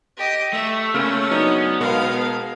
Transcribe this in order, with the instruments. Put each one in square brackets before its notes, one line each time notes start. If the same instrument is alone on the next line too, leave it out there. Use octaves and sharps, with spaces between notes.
[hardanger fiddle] G4 D#5
[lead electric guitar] A3 [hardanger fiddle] E5
[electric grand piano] C#3 A#3 F6 [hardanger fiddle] C#4
[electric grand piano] F#3 D4 D#4 [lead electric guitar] B3
[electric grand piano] B2 G#3 A#4 [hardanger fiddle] F5